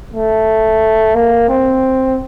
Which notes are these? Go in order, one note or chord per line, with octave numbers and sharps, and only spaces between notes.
A3
A#3
C4